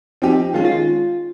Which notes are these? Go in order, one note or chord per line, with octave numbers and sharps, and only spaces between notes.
F3 C4 D#4 G4
D#3 G#3 C#4 F4
F4